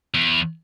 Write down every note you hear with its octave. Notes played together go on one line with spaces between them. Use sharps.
E2